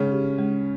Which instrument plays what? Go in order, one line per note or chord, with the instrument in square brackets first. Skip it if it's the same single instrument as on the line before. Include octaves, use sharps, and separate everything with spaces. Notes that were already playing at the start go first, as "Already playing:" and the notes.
Already playing: [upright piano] C#3 C#4 [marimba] G#3
[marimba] G4
G#3